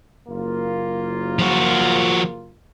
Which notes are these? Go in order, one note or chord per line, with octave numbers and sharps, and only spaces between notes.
F#1 A#3 F4
F3 F#4